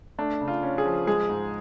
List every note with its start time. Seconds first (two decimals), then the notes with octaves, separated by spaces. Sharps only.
0.18 A3 D4
0.41 C#3
0.48 F4
0.63 C#4
0.78 G#4
0.86 F3
1.07 G#3 G#4
1.29 G#2